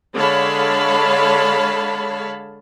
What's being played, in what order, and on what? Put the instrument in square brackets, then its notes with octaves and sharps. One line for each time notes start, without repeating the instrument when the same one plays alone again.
[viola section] D3 G#3 C#5 F5 A5 B5